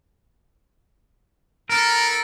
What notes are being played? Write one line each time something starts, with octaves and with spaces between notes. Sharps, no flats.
B3 E4 A4 A#4